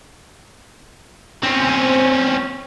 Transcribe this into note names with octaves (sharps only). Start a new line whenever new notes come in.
C4 C#4